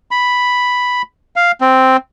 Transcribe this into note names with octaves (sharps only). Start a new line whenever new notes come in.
B5
F5
C4